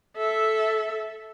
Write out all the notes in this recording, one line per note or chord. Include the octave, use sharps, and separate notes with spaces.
A4 E5